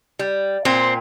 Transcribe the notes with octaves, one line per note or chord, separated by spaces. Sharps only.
G3
A#2 C4